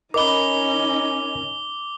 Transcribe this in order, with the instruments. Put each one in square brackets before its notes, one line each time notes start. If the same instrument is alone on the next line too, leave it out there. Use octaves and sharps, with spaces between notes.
[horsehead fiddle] C#4 D#4 [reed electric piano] A#4 D#5 B5 [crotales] D6 G7